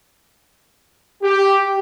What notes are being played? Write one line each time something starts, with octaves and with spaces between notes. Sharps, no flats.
G4